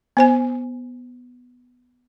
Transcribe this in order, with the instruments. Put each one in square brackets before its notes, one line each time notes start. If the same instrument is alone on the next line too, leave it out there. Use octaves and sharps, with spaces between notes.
[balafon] B3 C5 G#5